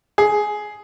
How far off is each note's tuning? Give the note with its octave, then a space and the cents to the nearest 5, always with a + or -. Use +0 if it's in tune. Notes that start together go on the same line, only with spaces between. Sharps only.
G#4 +15